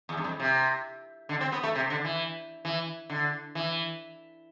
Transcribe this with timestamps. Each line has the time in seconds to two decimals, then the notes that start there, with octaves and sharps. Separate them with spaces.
0.09 E2
0.17 G2
0.24 F2
0.40 C3
1.29 D3
1.41 C4
1.52 B3
1.63 A3
1.75 C3
1.90 D3
2.04 E3
2.65 E3
3.10 D3
3.55 E3